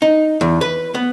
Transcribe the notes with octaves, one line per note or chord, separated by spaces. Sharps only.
D#4
E2
B4
B3